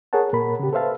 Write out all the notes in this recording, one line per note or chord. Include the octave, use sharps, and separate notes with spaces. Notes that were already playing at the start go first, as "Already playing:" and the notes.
G#4 A#4 C#5 F#5 A5
A#2 A#4 B5
C#3 G4
A4 B4 C5 E5 F5 A5